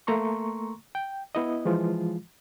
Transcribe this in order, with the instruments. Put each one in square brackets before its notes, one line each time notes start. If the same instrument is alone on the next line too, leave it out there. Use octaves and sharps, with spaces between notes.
[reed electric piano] A3 A#3 A#5 C6 C#6
G5
B3 E4 D#5
E3 F3 G#3 F4